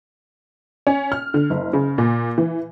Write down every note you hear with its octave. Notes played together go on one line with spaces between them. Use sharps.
C#4
F6
D3
F#1
C#3
A#2
E3